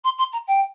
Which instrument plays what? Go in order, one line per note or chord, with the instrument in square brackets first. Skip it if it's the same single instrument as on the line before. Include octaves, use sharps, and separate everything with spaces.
[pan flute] C6
C6
A#5
G5